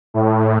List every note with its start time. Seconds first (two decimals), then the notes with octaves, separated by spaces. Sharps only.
0.14 A2